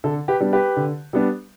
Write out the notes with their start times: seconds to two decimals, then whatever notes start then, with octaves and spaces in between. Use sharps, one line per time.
0.04 D3 A4
0.28 G4 B4
0.40 G3 B3 D4
0.53 G4 B4
0.77 D3
1.13 G3 B3 D4